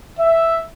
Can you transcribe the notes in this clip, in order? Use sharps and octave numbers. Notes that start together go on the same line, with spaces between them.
E5